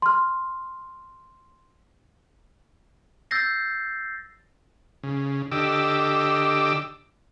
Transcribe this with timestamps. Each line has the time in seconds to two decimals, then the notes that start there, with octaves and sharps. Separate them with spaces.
0.02 C6 F6
3.31 E6 G6 A6 A#6 C7
5.03 C#3
5.52 D3 G4 D#5 D6 E6